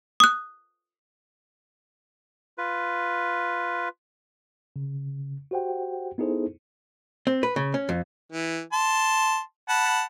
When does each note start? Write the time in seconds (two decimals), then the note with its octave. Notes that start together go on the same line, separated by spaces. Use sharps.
0.20 D#6 F#6
2.58 F4 B4
4.76 C#3
5.51 F#4 G4 C5 F#5 G5
6.18 B3 D#4 E4 G#4 A4 C5
7.27 C4
7.43 B4
7.56 C#3
7.74 C#4
7.89 F2
8.32 E3
8.73 A5 C6
9.69 F#5 A5 B5